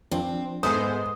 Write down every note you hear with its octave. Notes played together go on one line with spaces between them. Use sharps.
F3 C4 D4
G#2 G#3 B3 A4 C5 D#5 E5 D#6